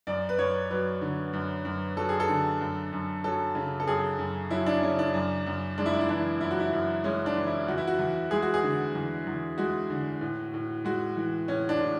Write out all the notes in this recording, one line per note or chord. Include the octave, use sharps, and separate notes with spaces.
F#2 D5
B4
F#2 C#5
F#3 B4
D3
F#2
F#2
F#3 A4
G#4
A4
D3
F#2
F#2
F#3 A4
C#3
A4
F#2 G#4
F#2
F#3 E4
D4
C#3 C#4
D4
F#2
F#2
G#3 D4
E4
D4
E4
E3 D4
F#2 E4
F#4
E4
F#2
G#3 C#4
D4
E3
E4
E2 F#4
E4
F#4
E2
G#3 G#4
F#4
G#4
D3
E2
E2
G#3 F#4
D3
A2
A2
G#3 F#4
E3
A2 C#4
D4
A2